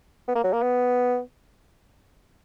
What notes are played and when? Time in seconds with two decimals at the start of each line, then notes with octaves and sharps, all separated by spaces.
0.28 B3
0.35 A#3
0.44 F#3
0.53 A#3
0.62 B3